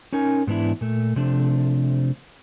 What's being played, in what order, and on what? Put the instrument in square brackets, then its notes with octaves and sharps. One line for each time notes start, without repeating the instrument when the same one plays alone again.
[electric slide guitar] C#4 D#4 A#4 G#5
G#2 E3 B3 D4 E4
A#2 A3
C3 F3 A3 D4